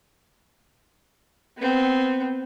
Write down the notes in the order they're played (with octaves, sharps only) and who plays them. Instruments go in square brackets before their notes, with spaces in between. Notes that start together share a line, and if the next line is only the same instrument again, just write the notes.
[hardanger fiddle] B3 C4